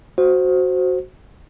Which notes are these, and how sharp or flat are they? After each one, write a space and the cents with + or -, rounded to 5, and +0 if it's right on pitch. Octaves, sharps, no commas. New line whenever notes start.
F#4 +0 C5 +0